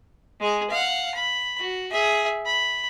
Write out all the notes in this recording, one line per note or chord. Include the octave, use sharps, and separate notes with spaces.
G#3 G#4
F5 F#5
B5
F#4
G#4 E5
B5